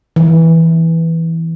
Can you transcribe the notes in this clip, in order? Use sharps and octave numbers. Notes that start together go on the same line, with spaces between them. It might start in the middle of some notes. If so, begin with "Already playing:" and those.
E3